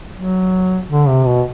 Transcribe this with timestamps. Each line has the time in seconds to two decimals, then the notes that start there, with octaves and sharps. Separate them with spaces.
0.15 F#3
0.89 D3
1.08 C3
1.26 B2